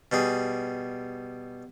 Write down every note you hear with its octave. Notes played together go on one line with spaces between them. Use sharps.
B2 G3 G#4